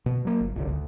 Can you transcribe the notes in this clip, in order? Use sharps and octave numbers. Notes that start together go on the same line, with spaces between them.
B2
F#3 A#3
G1
G1 C2 D3
D2